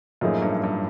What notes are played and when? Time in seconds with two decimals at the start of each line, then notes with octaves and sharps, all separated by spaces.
0.21 F#2 A2 F3 A#3 D#4 G#4
0.42 G2
0.64 G2